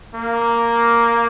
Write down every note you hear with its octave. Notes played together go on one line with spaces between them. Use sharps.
A#3